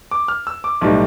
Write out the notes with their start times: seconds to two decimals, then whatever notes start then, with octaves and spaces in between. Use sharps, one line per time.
0.11 D6
0.28 F6
0.47 E6
0.64 D6
0.81 B1 A2 G3